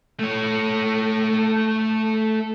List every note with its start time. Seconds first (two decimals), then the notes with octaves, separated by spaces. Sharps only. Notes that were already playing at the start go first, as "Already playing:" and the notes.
0.19 A3 C#5